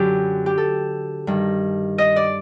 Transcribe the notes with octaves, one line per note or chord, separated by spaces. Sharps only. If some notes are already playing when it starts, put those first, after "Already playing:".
Already playing: F#2 D3 G4
G4
A4
G2 D#3
D#5
D5